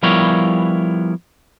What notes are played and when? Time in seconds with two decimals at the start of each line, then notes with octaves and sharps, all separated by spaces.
0.03 F3 G3 B3 E4 A#4 C#5